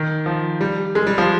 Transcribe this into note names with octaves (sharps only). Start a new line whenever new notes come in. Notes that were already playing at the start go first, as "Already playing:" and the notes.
Already playing: D#3
F3
G3
G#3
G3
F3